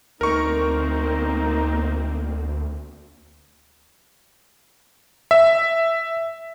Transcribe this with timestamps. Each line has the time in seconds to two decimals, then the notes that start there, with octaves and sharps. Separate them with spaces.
0.21 D2 A#3 C4 D#4 A#4 C#6
5.31 E5